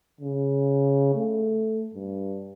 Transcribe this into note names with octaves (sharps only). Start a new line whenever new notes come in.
C#3
A3
G2